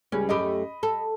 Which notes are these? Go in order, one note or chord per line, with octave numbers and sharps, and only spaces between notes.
C#2 G3 C#4
F#2 A3 G4 D#5 B5
A4